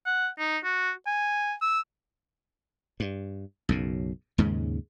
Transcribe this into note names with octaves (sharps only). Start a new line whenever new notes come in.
F#5
D#4
F#4
G#5
E6
G2
B1 F#2 C#3
D#2 G#2 C#3 G#3